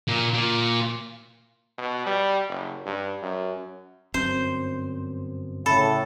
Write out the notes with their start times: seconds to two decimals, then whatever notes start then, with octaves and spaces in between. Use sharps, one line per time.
0.08 A#2
0.34 A#2
1.78 B2
2.06 G3
2.48 F#1
2.86 G2
3.22 F#2
4.14 G1 F#2 C4 C5
5.66 A2 C#3 A4 B5